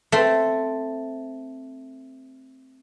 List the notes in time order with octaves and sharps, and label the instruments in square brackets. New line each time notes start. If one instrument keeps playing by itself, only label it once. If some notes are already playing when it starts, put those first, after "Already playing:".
[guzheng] A3 C4